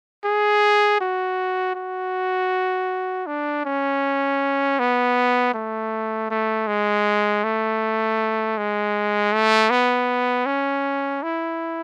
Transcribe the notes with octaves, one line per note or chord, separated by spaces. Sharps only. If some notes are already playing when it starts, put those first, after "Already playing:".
G#4
F#4
F#4
D4
C#4
B3
A3
A3
G#3
A3
G#3
A3
B3
C#4
E4